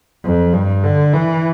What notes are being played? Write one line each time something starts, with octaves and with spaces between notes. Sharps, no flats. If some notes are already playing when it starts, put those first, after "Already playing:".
F2
G2
D3
E3